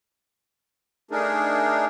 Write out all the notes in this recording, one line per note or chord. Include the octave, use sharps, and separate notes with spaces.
A3 D4 D#4 G#4 A#4